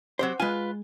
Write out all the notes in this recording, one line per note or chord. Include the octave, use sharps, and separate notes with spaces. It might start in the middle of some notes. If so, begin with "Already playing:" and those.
F#3 C4 G4 C5
G#3 F4 B4 G#5